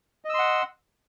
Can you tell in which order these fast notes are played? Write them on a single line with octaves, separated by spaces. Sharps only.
D#5 E6 C6 F#5